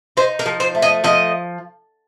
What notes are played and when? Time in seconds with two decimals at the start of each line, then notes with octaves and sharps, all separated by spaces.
0.17 D#4 C5
0.39 A#4
0.46 F3
0.60 C5
0.75 A3
0.82 D#5
1.04 F3 D#5